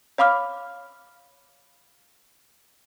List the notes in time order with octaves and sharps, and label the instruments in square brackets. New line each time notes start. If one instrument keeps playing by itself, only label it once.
[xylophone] C#5 F5 B5 D6 F6